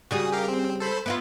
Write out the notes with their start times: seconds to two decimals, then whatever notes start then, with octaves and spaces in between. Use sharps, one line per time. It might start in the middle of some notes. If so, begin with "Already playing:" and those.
0.11 C#3 G3 F#4 G#4 D#6
0.32 G4 A#4 F5
0.48 C4
0.80 A4 C5 B5
1.06 B3 E4 F4 B4